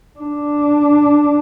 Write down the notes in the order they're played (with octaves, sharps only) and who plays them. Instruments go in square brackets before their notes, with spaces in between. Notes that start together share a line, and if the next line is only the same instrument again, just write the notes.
[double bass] D4